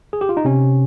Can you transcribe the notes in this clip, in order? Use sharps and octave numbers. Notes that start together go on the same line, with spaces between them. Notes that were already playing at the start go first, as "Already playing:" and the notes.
G#4
G4
F4
D#4
C3 C#4